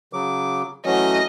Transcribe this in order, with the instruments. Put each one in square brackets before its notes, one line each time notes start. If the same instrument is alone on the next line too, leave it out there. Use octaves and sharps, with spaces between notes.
[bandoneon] C#3 F#3 D6
[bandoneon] E3 A3 C#4 [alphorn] F#3 [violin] D#5